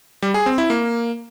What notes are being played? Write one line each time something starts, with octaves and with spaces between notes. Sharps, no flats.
G3
G#4
C4
E4
A#3